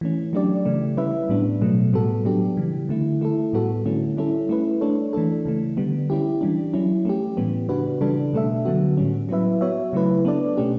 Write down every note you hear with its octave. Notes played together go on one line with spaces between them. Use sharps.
E3 A3 C#4
F#3 A3 D4 G4 D5
C#3 E3 A3
G3 C#4 E4 B4 E5
A2 G3 B3 D4
B2 F#3 A3
A2 G3 B3 F#4 A4
F#3 B3 D4 G4
C#3 E3 G3
D3 A3 E4
A3 E4 A4
A2 G3 B3 F#4 A4
D3 A3 C#4 E4
G3 C#4 E4 A4
A3 E4 B4
A3 D4 A4 C#5
E3 A3 D4 A4
C#3 E3 A3
D3 G3 B3
G3 C#4 E4 G4
E3 G3 D4
F#3 C#4 E4
A3 C#4 G4
A2 E3 G3 B3
C#3 G3 D4 F#4 B4
C#3 E3 G3 D4 A4
B2 A3 D4 A4 E5
D3 F#3 B3 F#4
A2 G3 C#4
F#3 B3 E4 B4 E5
B3 F#4 C#5 E5
C#3 F#3 A3 E4 B4
B3 D4 A4 D5
B2 A3 C#4 G4